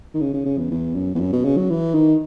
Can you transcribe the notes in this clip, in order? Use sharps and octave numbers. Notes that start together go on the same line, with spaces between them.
D#3
C#3
C#3
C#3
E2
E2
F#2
E2
F#2
B2
C#3
F#3
E3
D#3